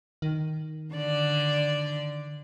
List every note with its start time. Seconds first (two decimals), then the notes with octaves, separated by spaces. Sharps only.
0.22 D#3
0.94 D3 D5